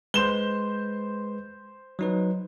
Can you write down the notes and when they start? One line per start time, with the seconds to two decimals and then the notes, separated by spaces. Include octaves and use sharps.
0.14 G#3 B4 C5 E7 G7
1.99 F#3 D#4 B4